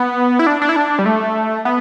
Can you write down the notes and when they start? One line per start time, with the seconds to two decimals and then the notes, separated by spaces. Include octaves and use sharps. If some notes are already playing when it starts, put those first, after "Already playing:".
Already playing: B3
0.39 E4
0.47 D4
0.62 D4
0.69 E4
0.76 D4
0.99 G3
1.06 A3
1.65 B3